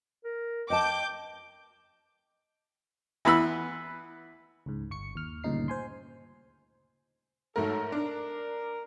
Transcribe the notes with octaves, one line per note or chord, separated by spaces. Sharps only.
A#4
D#5 G5 A5 D6 G6
E3 B3 B5 E6
C#2 G#2
G1 C#6 C#7
D#2 F6
D2 G2 A#2 C#3 D#4 C7
C5 G#5 C6
G#2 F#3 A3 A4 A#4
D4 A#4